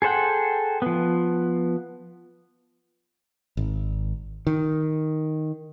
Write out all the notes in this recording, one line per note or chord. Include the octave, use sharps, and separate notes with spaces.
G#4 A4 C5 F#5 G5
F3 B3
G#1
D#3